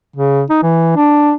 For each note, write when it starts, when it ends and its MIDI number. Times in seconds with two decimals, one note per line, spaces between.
0.16 0.42 49
0.50 0.58 63
0.63 0.93 52
0.96 1.32 62